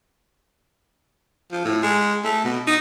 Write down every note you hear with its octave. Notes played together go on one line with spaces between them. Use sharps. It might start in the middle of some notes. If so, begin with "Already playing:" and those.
F3
A2
G#3
A3
B2
D#4